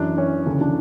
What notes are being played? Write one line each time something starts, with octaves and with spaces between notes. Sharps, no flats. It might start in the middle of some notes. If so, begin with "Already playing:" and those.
Already playing: F#2 E3 D4
C#4
D2 C#3 E3 D4
D4